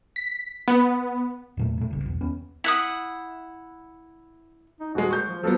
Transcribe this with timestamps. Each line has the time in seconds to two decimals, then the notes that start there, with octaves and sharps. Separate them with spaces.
0.16 B6
0.68 B3
1.57 E2 A#2 A3
1.77 A#2 A3
1.91 G1 C#2
2.02 B1 E2
2.21 D#2 B3 C#4
2.64 E4 F#5 D#6
4.80 D#4
4.95 D#1 G#3 F#4
5.11 C#6 G6
5.27 F3
5.43 F3 F#3 B3 A4